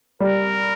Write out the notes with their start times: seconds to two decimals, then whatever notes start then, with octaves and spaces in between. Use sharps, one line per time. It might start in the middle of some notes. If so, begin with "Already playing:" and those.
0.20 G3 A#4